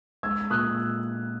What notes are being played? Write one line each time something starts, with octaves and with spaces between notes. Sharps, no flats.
G#3 E6 G#6
A#2 D#6 F#6